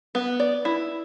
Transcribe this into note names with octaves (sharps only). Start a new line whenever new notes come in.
B3
D5
E4